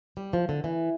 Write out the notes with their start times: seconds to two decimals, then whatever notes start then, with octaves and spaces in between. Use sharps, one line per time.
0.17 G3
0.33 F3
0.49 D3
0.64 E3